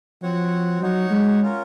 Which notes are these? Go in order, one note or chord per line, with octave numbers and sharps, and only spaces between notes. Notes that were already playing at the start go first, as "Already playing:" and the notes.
F3 C4 F#4 C#5 F#5
F#3 D#4 F#4 C#5 F#5
G#3
C#4 F4 A#4